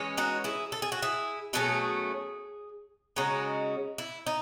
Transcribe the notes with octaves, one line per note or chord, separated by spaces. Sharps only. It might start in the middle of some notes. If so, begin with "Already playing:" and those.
Already playing: E3 G#3 C#4
D#4 F#4
E4 G#4
A4
G#4
F#4
E4 G#4
B2 F#3 A3 C#4 E4 G#4
C#3 G#3 C#4 D#4 F#4
E4
D#4